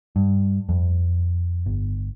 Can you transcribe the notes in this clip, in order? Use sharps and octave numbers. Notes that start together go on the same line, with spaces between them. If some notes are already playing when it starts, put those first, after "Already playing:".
G2
F2
G1